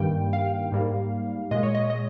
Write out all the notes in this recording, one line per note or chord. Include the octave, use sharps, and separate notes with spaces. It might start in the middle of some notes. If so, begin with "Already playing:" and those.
Already playing: G2 D#3 G3 A#3 G5
F5
G#2 G3 A#3
A#2 G#3 D#5
C#5
D#5
D#5